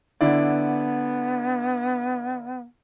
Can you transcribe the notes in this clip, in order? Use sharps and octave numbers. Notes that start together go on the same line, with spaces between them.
D3 B3 E4 D5